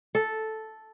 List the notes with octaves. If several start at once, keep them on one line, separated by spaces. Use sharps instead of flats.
A4